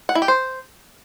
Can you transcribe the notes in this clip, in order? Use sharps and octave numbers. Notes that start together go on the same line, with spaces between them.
F#5
E4
G4
C5